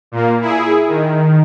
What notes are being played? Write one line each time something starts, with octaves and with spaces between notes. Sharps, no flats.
A#2 A#3
E4 G#4
D#3